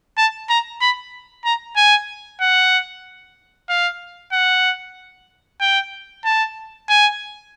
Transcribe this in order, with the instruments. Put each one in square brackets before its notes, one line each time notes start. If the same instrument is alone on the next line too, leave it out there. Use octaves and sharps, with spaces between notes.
[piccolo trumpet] A5
A#5
B5
A#5
G#5
F#5
F5
F#5
G5
A5
G#5